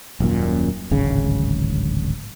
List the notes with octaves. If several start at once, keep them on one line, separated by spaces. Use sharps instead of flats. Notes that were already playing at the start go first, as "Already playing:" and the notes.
D#1 F#2 A#2
D1 G#1 C#3